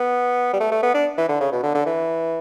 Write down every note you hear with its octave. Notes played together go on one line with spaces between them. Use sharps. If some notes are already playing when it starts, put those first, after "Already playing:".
Already playing: B3
G3
A3
A3
B3
D4
E3
D3
C#3
B2
D3
D3
E3